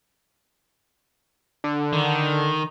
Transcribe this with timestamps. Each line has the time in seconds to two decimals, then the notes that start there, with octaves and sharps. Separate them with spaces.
1.64 D3
1.93 D#3